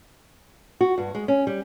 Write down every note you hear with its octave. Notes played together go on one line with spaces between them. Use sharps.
F#4
G2
G#3
C#4
G3